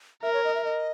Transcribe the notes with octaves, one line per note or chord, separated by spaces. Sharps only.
A#4 E5
C#5
D#5
E5
D#5